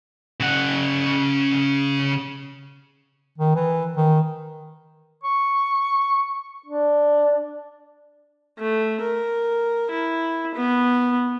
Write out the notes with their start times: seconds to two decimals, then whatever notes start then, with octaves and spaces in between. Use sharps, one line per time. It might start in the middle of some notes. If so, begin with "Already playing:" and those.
0.40 C#3 F#5
3.38 D#3
3.55 E3
3.97 D#3
5.24 C#6
6.66 D4
8.59 A3
9.02 A#4
9.90 E4
10.55 B3